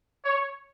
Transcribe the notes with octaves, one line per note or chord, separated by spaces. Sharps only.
C#5